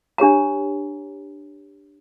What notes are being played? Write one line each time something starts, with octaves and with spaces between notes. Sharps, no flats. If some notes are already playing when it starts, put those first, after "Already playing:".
D4 G4 C#5 A#5